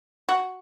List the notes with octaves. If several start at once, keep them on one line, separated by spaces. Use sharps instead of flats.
F#4